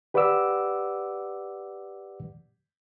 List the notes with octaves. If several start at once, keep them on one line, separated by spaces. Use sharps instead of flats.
G4 B4 D5 F#5 D6 E6